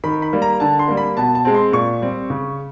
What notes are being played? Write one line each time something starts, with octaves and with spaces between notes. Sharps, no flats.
D#3 B5
B5
G3 A#3
A#5
D3 A5
C6
G3 A#3
B5
B2 A5
A5
G#3 C4
C6
A#2 C#6
G3 C4
C#3